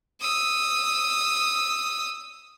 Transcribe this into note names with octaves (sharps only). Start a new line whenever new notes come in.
D#6 E6